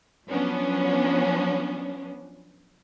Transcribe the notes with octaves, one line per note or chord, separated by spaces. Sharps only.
F3 F#3 B3 C#4 D4